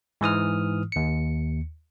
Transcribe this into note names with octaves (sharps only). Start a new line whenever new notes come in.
G#2 E3 D#6 F6
D#2 C#7